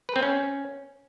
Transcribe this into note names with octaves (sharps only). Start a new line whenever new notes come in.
B4
C4
C#4